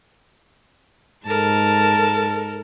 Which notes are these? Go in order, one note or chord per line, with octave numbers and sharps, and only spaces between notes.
G#2 A4 A#4 A5